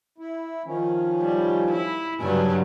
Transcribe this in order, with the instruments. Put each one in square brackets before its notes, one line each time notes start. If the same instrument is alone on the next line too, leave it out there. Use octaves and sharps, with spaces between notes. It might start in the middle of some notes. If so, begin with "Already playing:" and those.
[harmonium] E4
D#3 F3 C#4
[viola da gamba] G3
E4
[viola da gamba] G2 C#3 F#3 [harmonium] D4 G#5